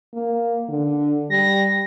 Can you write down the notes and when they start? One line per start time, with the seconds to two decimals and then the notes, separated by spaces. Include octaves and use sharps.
0.14 A#3
0.69 D3
1.30 G3 A#6